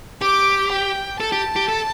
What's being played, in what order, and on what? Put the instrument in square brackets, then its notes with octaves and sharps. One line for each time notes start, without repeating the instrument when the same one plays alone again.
[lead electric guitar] G4 [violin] D6
[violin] G5
[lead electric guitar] A4 [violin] A5
[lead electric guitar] G4
G4
A4